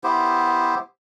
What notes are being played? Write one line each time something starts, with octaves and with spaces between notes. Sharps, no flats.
B3 E4 G4 C5